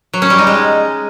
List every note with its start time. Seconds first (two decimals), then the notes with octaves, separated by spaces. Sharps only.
0.13 F#3
0.22 C#4
0.30 G3
0.39 D#4
0.47 G#3